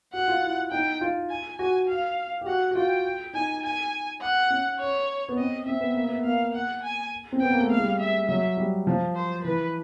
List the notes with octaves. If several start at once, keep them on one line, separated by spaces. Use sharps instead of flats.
F#4 F#5
F4
E4
D#4 G5
F4
G#5
F#4 G#5
F5
G4
F#4 F#5
F#4
F4 G5
D#4 G#5
G#5
F#5
C#4
C#5
B3
C4 D#5
C4 E5
B3
A#3
B3
A#3 F5
F#5
G#5
C4
B3 G5
A#3
A3
G#3 F5
G3
E5
F#3 E5
G3
F3
C5
E3 B4